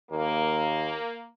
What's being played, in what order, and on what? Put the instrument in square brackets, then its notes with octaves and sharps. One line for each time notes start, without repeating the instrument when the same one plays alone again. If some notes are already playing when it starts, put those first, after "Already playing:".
[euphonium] D#2 [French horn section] A#3